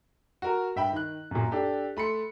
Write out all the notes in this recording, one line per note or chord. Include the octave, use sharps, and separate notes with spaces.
F#4 A#4 A#5
G2 E5 G5 B5
D#3 F#6
F#2 A#2
D4 G4 A4
A3 B5 C6 C#7